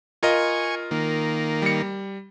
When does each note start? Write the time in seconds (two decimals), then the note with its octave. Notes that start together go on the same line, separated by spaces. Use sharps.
0.23 F4 A#4 D#5 G#5 C#6
0.91 D#3 A#3
1.62 G3 C#7